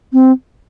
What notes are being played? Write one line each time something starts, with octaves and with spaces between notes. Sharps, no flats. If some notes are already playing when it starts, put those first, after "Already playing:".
C4